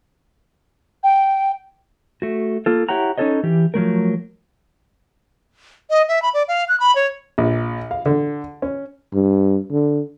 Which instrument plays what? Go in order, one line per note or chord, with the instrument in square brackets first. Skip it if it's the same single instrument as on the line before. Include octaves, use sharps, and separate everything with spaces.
[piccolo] G5
[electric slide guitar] A3 F#4
A#3 F4 A4
E4 G4 C#5 F#5 A#5
C#4 D#4 G4 A4 C#5 D#5
E3 G4
F3 F#3 A3 A#4
[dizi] D#5
E5
B5
D5
F5
F#6
B5
C#5
[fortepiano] A#1
F5
D3
C#4
[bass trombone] G2
D3